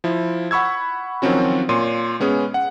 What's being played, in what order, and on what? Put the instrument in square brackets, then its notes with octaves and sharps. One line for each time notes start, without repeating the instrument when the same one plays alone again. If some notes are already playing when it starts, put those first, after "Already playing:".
[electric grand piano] F3 E4
F#5 B5 C#6 E6 G#6
D#3 F3 F#3 C4 C#4 F#4
A#2 C#5 C6 D#7
G#3 B3 C#4 G#4
F#5